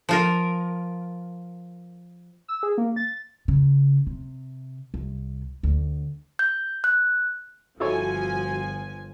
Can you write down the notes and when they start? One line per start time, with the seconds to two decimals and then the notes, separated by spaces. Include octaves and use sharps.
0.09 F3 F4 A#4
2.48 E6
2.63 G#4
2.78 A#3
2.96 A6
3.48 C#3
4.07 C3
4.94 C2
5.63 D2
6.39 G6
6.84 F#6
7.80 G1 F3 E4 F#4 A4 C#5 G#5